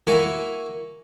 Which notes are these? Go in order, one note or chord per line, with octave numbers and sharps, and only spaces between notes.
A#3 E4 F#4 A#4 G#5 C#6